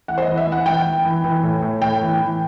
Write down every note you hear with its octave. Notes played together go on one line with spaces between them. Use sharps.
E3 F#5
C5
D#5
E3
E5
E3
F#5
E3 G5
E3
E3
E3
A2
A2
A2 G5
E3
E3